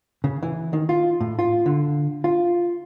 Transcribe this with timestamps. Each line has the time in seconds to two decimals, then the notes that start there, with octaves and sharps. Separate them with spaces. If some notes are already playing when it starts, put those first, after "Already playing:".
0.24 C#3
0.43 E3
0.73 D#3
0.89 F4
1.21 A2
1.39 F4
1.66 D3
2.24 F4